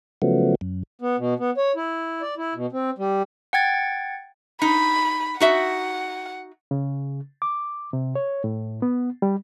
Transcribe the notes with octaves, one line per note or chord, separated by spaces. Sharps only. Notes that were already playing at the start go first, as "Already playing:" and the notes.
C#3 F3 F#3 A3 B3
F#2
B3
B2
B3
C#5
E4
D5
E4
B2
C4
G3
F#5 G5 G#6 A6
D#4 B5
D#4 F#4 E5 F#5
C#3
D6
C3
C#5
A2
B3
G3